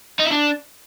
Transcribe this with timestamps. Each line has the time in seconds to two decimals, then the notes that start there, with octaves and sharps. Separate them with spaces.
0.20 D#4
0.25 E4
0.31 D4